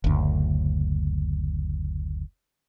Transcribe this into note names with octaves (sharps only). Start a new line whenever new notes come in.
F#1 D2